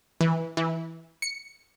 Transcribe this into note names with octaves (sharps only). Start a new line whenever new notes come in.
E3
E3
C#7